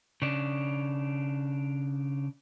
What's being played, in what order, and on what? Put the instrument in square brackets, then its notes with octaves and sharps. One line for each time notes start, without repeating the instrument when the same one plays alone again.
[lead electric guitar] C#3 D4